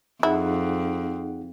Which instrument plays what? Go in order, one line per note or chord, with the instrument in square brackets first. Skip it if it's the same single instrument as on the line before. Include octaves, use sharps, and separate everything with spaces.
[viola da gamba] F2 [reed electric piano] D#4 G#4 F#5 [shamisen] E4